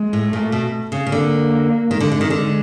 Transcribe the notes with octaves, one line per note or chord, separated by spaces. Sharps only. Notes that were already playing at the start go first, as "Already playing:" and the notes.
Already playing: G#3
A2
A#2 A3
B2
C#3
C#3
D3 A#3
D#3 G#3
D3
D3
D#3
D3 G#3